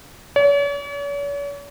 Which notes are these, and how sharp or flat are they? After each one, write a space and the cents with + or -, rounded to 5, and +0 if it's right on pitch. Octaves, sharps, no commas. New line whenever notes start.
C#5 +45